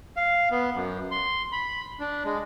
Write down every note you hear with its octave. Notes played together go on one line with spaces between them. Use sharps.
F5
B3
F#2
C6
B5
D4
G#3